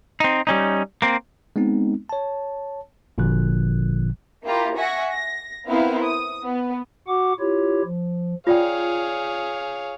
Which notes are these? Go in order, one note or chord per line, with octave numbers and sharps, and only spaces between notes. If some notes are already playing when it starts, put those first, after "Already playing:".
C4 D#4
G3 C#4 D#4
A#3 C4
G#3 B3 C4 D#4
C#5 A5
G#1 A#2 D3 F3 F#6
A#3 E4 F4 G4 A#5
E5 F#5 G#5 C#6 A#6
A#6
B3 C4 E4 A#4 C5 F5
D#6
B3
F#4 F#5 D6
E4 F4 G4 C#5
F3
F4 G#4 C#5 D5 F5 G5